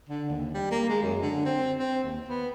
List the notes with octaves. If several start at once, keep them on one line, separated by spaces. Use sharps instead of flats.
D3
D#2
G3
A#3
G#3
F#2
D3
C4
C4
D#2
B3